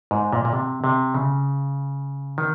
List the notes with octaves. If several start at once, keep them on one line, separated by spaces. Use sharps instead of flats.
G#2
A#2
A#2
C3
C3
C#3
D#3